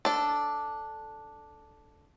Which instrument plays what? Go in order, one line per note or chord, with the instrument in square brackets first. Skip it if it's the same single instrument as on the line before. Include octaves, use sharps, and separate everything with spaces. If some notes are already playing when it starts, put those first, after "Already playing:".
[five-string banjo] D4 A4